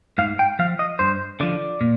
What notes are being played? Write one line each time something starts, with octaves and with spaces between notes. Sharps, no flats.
G#2 F5
G5
F3 F5
D#5
G2 C5
D3 F3 D5
A#2